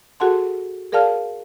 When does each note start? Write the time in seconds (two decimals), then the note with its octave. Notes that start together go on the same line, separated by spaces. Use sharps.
0.20 F#4 G#4 A4 F#5 A5 C6
0.92 G#4 A#4 D5 F5 A5 F6